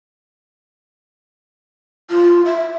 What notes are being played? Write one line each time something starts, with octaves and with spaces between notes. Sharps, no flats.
F4
E5